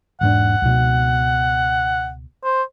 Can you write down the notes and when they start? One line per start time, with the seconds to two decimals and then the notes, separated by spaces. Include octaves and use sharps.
0.21 E1 G#2 D4 F#5
0.62 C#2 B2
2.44 C5